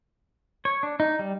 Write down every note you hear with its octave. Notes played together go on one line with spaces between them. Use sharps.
C#5
D4
D#4
G3